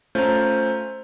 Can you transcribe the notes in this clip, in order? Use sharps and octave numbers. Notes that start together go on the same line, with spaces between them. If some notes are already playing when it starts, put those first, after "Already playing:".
A3 C#4 F4 C5 A#5